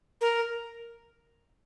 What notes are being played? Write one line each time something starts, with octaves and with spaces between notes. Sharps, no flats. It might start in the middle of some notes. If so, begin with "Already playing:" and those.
A#4